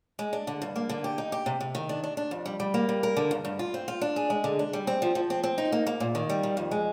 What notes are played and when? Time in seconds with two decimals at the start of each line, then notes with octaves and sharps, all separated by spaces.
0.19 G#3
0.33 D4
0.47 D3
0.62 G2
0.76 A#3
0.89 D3
1.04 G4
1.18 D#4
1.32 G4
1.46 C3
1.60 C3
1.75 D#3
1.89 D4
2.04 D4
2.17 D4
2.31 F2
2.46 G3
2.60 G3
2.74 A#3
2.89 G3
3.03 A#4
3.17 D3
3.31 G2
3.45 G2
3.59 F4
3.74 C4
3.88 F4
4.01 D4
4.16 G#4
4.30 G#3
4.44 D3
4.59 D4
4.73 G3
4.87 C4
5.02 F3
5.15 F3
5.30 C4
5.43 C4
5.58 D#4
5.72 A#3
5.87 A#3
6.00 A#2
6.15 D#3
6.29 G3
6.43 D#3
6.57 F2
6.71 G#3